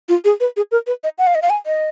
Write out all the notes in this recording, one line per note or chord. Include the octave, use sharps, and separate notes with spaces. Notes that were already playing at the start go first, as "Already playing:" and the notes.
F4
G#4
B4
G#4
A#4
B4
D#5
F#5
F5
D#5
F5
G#5
D#5